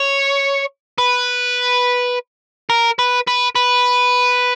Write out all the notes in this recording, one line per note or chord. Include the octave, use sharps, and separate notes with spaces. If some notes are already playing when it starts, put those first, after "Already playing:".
Already playing: C#5
B4
A#4
B4
B4
B4